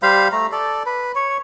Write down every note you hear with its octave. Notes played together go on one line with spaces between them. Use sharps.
G3 C5 F5 B5
A3 A#5
A4 D5
B4
C#5